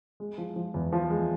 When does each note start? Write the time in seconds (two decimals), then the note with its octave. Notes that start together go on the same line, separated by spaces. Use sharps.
0.20 G#3
0.38 F3
0.56 F3
0.74 E2
0.93 F3
1.10 G#3